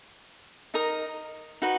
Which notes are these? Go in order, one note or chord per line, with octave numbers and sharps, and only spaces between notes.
D#4 A#4 D#5 A#5
D#4 F#4 B4